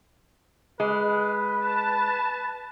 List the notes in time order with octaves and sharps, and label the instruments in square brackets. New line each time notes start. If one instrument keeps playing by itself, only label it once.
[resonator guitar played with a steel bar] G#3 [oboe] B4
[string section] A5